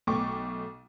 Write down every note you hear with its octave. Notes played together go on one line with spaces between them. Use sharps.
B1 A3 G5 C#6 D6